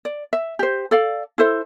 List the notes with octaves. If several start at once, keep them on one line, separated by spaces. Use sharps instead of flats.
D5
E5
G4 C5
A4 D5 F5
E4 A4 C5 E5